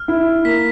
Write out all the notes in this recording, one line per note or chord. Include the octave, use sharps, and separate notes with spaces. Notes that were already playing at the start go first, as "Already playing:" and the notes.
Already playing: F6
E4
A#3 B6